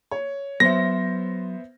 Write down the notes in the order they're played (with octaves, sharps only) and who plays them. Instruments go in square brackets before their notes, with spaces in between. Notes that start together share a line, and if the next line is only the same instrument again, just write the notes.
[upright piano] C#5
[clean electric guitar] F#3 C6 [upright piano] B3 C5 E5 [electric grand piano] A#6